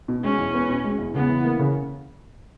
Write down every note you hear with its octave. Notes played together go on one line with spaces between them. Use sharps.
B2
G#3 C#4
E2
B3
B2
G#3
E2
C#3 B3
E3
A#3
C#3